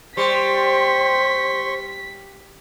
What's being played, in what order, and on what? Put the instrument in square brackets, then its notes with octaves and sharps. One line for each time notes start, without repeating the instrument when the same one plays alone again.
[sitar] G3 [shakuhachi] C5 [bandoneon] C6 C#6 [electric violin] B6